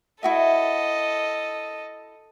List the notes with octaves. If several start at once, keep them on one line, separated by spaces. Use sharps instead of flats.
E4 F#4 A4 D#5 E5